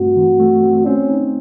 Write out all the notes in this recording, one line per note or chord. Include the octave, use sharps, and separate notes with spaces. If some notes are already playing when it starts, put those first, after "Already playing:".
Already playing: G2 A3 C4 F#4
E3
A3
C4
C4 C#4
D#4